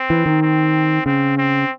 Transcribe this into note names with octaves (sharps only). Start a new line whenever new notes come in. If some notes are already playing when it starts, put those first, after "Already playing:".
Already playing: C4
E3
D#3
C4
C#3 C4
C4